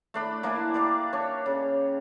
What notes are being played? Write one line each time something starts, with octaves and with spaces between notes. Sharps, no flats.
A3 D4 B5
A#3 D4 E4 G#5
G4 D5 F5
D4 C#5
C#3